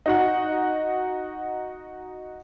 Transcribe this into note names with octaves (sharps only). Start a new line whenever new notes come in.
D#4 F#4 F#5